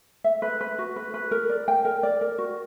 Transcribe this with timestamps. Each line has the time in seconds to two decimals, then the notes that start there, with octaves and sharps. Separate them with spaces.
0.24 E5
0.42 B4
0.61 B4
0.79 F#4
0.96 B4
1.14 B4
1.31 A#4
1.49 D5
1.68 G5
1.85 A#4
2.03 D5
2.21 A#4
2.38 F#4